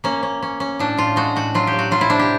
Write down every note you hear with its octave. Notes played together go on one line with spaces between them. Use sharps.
A#3 C#4
C#4
C#4
C#4
A2 D4
A2 F4
G#3 F#4
A2 F#4
F#3 F4
G4
F#3
F#4
F#3 F4
E4
C3 D4
G4